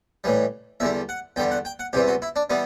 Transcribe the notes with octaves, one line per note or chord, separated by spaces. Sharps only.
A2 E3 G3
E2 D3 G3 E5
F#5
E2 D3 G3 G5
F#5
G5
F#5
E2 C3 E3 G3 G4
F#4
E4
D4
E3 G3 B3